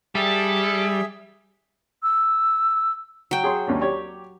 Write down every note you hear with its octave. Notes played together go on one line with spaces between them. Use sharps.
G3 G#4 A4 E5 E6
E6
F#3 G5
G#4 C#5 C6
D#2 C#4 D4
G4 C#5 D5